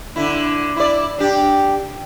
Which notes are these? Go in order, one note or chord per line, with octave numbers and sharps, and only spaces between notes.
D3 E4
E4 D5
D4 G4